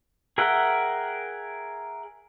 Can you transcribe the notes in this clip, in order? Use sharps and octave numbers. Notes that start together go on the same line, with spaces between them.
G#4 A#4 E5 F#5 G5